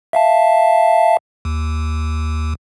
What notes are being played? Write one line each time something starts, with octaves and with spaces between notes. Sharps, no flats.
E5 F5 A5
D#2